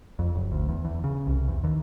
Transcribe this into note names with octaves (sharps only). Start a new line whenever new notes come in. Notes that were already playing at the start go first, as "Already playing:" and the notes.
F2
F#1
D2
E2
E2
C#3
C2
E2
D#2